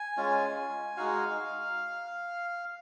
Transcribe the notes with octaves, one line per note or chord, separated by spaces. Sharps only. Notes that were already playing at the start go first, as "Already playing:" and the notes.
Already playing: G#5
G#3 C#4 F4
G#3 D#4 F#4 F5